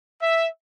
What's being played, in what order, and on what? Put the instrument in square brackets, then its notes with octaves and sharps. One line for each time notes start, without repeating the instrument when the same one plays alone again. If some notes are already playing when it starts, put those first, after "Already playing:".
[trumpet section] E5